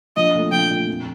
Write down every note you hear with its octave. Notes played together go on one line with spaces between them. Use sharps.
A#1 D#5
A#2 A3
A#1 G5
A#2 A3
F2